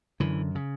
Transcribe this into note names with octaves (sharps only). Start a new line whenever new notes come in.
F#2 D3 E3
C#3